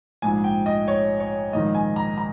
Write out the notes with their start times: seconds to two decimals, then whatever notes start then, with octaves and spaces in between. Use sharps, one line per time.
0.22 A#1 G#2 F3 G#5
0.44 G5
0.66 D#5
0.88 C#5
1.20 C#5
1.53 A#1 G#2 D#3 D#5
1.75 G#5
1.96 A#5
2.18 A#5